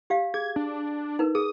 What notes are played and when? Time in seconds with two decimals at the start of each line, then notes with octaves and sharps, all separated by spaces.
0.10 G4 D5 F5
0.34 G#4 G#6
0.56 D4
1.19 D#4 A#4 B4
1.35 G#4 D#6